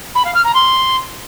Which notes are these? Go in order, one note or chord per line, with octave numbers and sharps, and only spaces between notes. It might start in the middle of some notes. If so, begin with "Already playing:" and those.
B5
F5
F6
A#5
C6